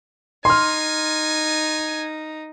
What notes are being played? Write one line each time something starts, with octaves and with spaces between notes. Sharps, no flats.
D#4 G#5 C6 F6